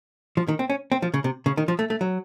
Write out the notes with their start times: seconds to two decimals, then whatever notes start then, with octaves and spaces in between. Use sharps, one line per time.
0.37 F3
0.48 D#3
0.59 C4
0.70 C#4
0.92 C4
1.02 F3
1.14 C#3
1.24 C3
1.46 C#3
1.57 D#3
1.68 F3
1.79 A3
1.90 A3
2.01 F#3